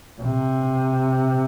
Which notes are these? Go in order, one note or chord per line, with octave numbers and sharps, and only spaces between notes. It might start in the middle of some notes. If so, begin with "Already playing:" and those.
C3